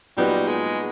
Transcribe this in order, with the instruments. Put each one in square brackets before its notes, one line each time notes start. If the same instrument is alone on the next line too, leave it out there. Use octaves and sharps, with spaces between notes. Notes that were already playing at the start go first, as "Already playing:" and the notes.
[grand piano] A#2 F#3 B3 D#4 F#4 [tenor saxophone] G3
[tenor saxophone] G#3